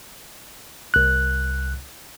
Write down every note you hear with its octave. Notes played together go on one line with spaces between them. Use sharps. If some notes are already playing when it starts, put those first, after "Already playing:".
C2 F#6